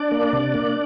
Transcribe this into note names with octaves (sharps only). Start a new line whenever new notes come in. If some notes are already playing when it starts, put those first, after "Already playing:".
Already playing: D4 D5
A#3
C3
A#3